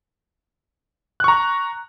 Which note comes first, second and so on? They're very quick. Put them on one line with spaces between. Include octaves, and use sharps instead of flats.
F#6 C#6 A#5